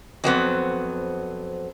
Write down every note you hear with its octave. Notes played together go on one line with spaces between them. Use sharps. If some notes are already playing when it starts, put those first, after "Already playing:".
F2 F#3 B3 C4